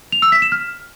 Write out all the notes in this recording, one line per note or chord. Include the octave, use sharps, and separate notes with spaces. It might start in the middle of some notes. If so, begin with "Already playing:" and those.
F7
E6
B6
E7
F6